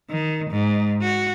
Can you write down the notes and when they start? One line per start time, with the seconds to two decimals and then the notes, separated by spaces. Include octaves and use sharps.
0.11 D#3
0.50 G#2
1.02 F#4